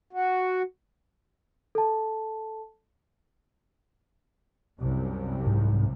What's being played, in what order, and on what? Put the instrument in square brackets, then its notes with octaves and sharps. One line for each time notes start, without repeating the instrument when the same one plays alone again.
[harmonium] F#4
[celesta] A4 A5
[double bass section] C2 F#2 C3
[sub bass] G#2